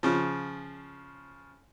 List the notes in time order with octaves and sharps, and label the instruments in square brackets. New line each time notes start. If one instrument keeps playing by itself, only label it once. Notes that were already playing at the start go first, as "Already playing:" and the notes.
[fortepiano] C#3 F3